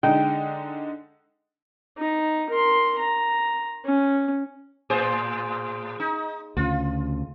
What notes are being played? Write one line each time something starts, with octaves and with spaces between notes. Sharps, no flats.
D3 G#3 D#4 G5
D#4
A#4 C6
A#5
C#4
A2 G#4 C5
D#4
D2 C#3 F4